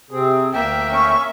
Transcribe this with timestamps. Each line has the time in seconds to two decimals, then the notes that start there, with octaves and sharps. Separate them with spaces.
0.11 C3 C4 G#4
0.53 D2 A#3 E5 G5
0.90 C#4 C#6